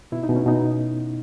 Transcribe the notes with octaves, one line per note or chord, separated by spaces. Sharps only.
B2 E4
D#4
B2
C#4
B2 D#4